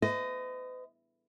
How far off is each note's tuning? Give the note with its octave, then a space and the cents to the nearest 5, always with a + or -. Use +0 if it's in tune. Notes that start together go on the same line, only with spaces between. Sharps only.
B4 +45 D#5 +0